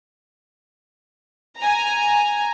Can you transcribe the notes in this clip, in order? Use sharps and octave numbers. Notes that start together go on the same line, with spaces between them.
G#5 A#5